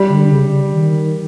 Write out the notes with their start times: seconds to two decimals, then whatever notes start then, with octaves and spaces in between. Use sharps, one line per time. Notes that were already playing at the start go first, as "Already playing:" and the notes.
Already playing: G3
0.09 D3
0.29 C#3
0.70 D#3